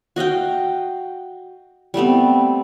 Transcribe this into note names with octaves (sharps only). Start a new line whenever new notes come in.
F#4 D#5 F5 G5
G3 A3 B3 C4